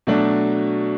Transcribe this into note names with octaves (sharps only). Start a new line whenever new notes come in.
B2 F#3 A3 D4